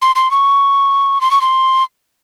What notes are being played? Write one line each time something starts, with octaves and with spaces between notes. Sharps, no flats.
C6
C6
C#6
C6
C#6
C6